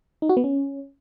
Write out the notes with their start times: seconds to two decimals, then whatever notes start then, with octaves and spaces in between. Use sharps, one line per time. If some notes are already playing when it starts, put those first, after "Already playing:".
0.22 D#4
0.29 F#4
0.37 B3
0.44 C#4